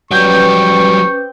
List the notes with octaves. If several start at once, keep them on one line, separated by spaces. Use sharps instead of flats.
F#3 G3 C4 C#4 B4 G5 C#6 D6